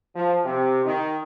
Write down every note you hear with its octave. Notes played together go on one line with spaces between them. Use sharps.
F3
C3
D#3